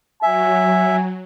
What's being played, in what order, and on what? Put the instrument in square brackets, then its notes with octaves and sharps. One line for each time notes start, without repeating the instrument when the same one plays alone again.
[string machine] F#3 [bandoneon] E5 [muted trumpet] G#5